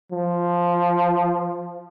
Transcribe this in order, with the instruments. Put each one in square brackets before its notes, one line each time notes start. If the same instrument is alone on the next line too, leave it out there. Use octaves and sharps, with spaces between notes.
[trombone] F3